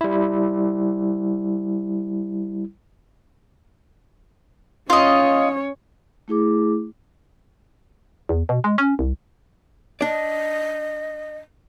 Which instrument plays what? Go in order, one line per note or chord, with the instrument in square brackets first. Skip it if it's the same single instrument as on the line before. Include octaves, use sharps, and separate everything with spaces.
[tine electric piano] G3 E4
[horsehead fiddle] C#4 C#5 [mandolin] F4 D#5
[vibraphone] A3 E4 G#4 D6
[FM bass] E2
B2
G#3
C#4
C2
[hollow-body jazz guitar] D4 D5 [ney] D#5